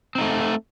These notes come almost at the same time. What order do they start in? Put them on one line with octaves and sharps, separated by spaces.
C4 D#4 A3